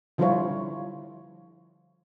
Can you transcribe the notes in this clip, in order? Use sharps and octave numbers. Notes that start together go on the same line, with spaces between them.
D3 F3 G3 E4 F4 C#5